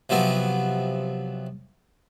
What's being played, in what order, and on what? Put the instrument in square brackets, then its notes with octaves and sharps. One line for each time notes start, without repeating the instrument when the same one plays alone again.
[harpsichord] C3 F3 F#3 B3